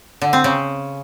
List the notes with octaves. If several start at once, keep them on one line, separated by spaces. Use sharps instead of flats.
D3
C4
C#3